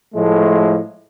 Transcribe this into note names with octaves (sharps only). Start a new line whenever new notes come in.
A2 F3 G#3 A3